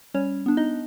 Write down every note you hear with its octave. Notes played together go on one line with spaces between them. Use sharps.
G3 C#4 C#5
B3 D4
D#4 D#5